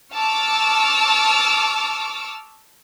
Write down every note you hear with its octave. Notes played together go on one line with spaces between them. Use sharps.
A5 C#6 D6 E6 F6